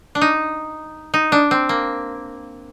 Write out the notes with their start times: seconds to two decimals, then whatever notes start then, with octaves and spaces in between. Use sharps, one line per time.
0.15 D4
0.21 D#4
1.14 D#4
1.32 D4
1.51 C4
1.69 A#3